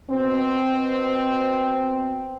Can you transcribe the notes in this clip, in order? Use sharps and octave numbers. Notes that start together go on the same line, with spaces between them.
B2 C4